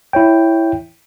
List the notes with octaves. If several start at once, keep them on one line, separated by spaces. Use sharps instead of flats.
E4 C#5 G5